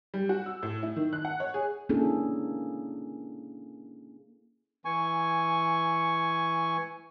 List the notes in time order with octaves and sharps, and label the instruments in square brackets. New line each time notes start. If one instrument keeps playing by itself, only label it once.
[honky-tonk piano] G3
F#4
E6
A2
E4
D#3
F#6
F#5
C#5
G#4
[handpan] A#3 C#4 D4 E4 G#4 A4
[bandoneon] E3 G#5 C#6